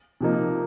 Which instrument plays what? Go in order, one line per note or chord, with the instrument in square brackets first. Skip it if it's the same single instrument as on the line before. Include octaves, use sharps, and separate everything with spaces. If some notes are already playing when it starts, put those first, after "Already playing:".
[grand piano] C3 F3 A#3 D#4